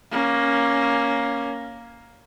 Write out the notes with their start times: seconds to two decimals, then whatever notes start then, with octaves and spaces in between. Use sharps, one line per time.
0.12 A#3 C#4